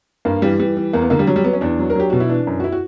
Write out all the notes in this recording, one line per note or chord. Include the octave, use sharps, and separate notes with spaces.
G2 A#3
E3 G3
E3 G3
E3
E2 A#3
B3
D3 A#3
G3
F#3
G3
F#3 B3
C#4
E2 D4
F#3
A#4
F#3 G4
B2 F#4
E4
E3 D4
F#2
F#4
E4
F#4